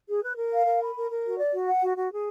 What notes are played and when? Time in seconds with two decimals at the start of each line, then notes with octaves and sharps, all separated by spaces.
0.08 G#4
0.23 B4
0.37 A#4
0.51 F5
0.65 A#4
0.80 B5
0.95 A#4
1.10 A#4
1.24 F#4
1.38 D5
1.52 F#4
1.67 F#5
1.82 F#4
1.96 F#4
2.11 G#4